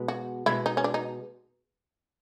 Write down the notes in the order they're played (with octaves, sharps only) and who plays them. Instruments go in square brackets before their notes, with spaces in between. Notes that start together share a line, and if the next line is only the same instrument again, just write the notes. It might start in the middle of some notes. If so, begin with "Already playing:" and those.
Already playing: [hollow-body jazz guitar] B2 G#3 B3
[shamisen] F#4
[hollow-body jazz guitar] B2 G#3 B3 [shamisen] E4
[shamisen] D#4
C#4
D4
D#4